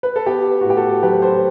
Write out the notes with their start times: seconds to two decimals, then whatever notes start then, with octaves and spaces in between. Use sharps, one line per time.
0.03 B4
0.16 A4
0.26 B3 G4
0.61 F#4
0.64 A2
0.70 G4
0.77 F#4 A4
1.03 F#3 G4 B4
1.13 B4
1.22 A4 C5